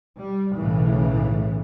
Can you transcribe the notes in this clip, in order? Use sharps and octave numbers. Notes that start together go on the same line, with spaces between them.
G3
B1 A2 C#3 E3